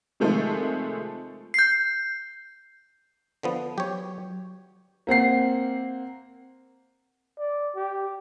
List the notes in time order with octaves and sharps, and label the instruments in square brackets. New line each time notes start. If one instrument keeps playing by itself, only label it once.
[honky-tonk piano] C3 D#3 F3 G#3 A3 A4
[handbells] G6 C7
[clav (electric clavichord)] D3 F3 B3
[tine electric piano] F#3 [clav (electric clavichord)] G4 C#5
[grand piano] A#3 C4 F#5 C7
[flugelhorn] D5
G4